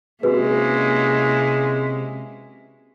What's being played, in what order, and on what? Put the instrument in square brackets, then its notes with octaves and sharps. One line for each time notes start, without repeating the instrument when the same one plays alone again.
[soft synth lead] C3 [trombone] G#3 [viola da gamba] A#3 C#4 E4 [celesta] F#4 G#4 B4